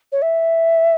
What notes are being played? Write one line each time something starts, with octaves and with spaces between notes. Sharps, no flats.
C#5
E5